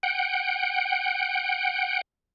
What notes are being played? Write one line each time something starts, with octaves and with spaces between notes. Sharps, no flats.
F#5 G5